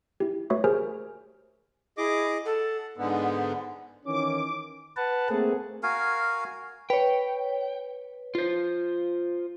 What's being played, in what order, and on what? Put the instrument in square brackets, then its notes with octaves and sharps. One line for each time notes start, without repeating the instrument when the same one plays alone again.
[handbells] E4 G4
A3 F#4 B4 C#5 E5 C#6
G4 G#4 A#4 C5 G#5 F6
[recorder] E4 [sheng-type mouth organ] G#4 D#5 D6
[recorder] A4 [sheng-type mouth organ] F#5
[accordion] G#2 D3 B3
[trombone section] D#3 E3 C#4 [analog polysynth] D6
[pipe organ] B4 F#5 A5
A3 A#3 C4 G#4
[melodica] F#4 A#4 F5 G#5
[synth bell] B4 C#5 [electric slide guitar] G5
[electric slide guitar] F4 C5